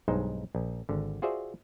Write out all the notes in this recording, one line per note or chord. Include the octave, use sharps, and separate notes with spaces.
B1 G2 G#3 D#4 C5
A#1
G#1 D3
F4 F#4 G#4 C5 D5 E5